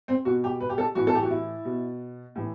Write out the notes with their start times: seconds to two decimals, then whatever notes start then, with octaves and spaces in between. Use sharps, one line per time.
0.08 C4
0.25 B2 F#4
0.44 G4
0.60 B4
0.69 G4
0.78 A4
0.95 A2 E3 F#4
1.07 A4
1.15 G4
1.22 F#4
1.30 E4
1.65 B2
2.35 A2 E3